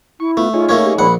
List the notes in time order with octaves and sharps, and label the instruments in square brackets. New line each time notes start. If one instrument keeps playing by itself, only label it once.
[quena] E4 [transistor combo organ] C#6
[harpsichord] A3 [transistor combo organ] B3 F4
[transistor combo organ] D#4 G#4 C#5 [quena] F4
[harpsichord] A3 A#3 C#4
[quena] G4
[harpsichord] A#1 F#5 [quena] B5